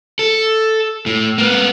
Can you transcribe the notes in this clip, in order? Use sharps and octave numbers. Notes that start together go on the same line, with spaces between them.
A4
A2
A#3 B3